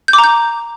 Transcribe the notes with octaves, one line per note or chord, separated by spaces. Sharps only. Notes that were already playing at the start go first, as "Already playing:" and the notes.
G6
D6
A#5
G6